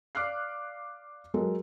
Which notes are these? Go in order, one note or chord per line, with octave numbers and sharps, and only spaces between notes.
D5 F5 D6 F6 F#6 C7
F#3 G#3 A4 A#4